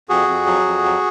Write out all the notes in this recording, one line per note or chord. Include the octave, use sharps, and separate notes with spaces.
F2 F#4 G#4
F2
F#3
F2
F#3